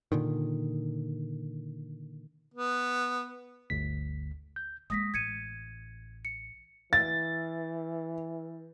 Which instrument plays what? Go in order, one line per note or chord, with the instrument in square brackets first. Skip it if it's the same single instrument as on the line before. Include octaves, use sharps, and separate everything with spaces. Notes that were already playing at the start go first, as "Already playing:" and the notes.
[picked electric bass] A#2 D3 D#3
[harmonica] B3
[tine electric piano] G1 D2 B6
G6
[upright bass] G#3 A#3 [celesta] D#6 A#6 B6
[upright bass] A1 [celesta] G#6 C#7 D#7
[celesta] C#7
[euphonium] E3 [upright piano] A6